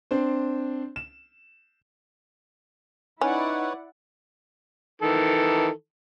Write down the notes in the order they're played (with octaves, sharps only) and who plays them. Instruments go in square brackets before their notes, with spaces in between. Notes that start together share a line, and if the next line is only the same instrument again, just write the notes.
[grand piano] C4 D4 C5
E7
[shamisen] C#4 [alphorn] D#4 [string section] E4 D5 F#5 [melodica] B4 C#5
[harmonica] D#3 E3 A4